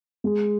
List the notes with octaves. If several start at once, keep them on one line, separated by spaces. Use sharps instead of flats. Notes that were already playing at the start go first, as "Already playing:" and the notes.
G#3